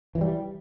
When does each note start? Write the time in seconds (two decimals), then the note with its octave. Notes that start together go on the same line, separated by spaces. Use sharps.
0.15 E3
0.18 F#3
0.21 G3